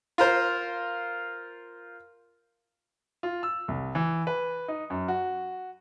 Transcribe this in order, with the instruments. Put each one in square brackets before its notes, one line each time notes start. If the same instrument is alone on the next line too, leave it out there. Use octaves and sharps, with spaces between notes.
[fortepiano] F4 A#4 C5
[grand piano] F4
E6
C2
E3
B4
D#4
F#2
F#4